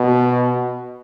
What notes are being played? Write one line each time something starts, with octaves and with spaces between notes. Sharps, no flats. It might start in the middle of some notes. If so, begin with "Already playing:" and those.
Already playing: B2